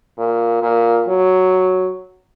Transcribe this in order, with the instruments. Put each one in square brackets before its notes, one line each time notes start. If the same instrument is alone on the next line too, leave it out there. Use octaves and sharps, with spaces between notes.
[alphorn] A#2
A#2
F#3